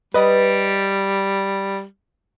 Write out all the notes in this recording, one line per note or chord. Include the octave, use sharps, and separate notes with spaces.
G3 B4 D#5